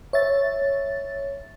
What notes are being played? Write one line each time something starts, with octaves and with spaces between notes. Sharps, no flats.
C#5 E5 A6